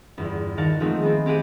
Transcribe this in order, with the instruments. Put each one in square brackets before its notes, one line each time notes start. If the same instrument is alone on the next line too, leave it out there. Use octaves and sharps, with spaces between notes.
[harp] G1 E2
D#3 A#4 F5 F#5 A5
D#3 F3 G#3 A3 C4 D#4
G#3 B3 C4
C4 G4 G#4 F#5 D#7